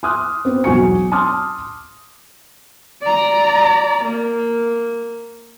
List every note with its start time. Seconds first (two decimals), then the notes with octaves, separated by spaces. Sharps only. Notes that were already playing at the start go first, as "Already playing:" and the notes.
0.03 C6 D6 D#6 F6 F#6
0.45 B3 C4
0.64 E1 B1 F#3 G#5 C#6 C#7
1.12 A5 C6 D6 D#6 F6
3.02 D5 A#5
4.05 A#3